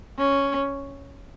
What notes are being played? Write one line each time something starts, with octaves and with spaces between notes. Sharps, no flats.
C#4